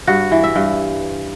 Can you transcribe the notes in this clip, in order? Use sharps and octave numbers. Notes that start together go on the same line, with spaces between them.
G2 F#4
E3
E5
G2